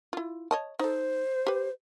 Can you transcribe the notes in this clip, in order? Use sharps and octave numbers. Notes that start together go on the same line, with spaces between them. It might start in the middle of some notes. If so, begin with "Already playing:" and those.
E4 F4
C#5 D#5 A5
D#4 A4 C5
G4 B4